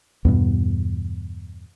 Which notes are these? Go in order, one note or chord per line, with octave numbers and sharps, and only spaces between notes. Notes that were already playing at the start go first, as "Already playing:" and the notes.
E2 G2 B2